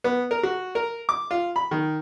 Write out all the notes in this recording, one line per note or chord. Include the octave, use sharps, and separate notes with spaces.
B3
A#4
F#4
A#4
D6
F4
B5
D#3